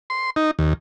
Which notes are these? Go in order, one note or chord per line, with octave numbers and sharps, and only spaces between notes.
C6
D#4
D#2